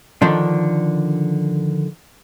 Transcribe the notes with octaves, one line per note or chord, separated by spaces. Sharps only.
D3 D#3 F3 D4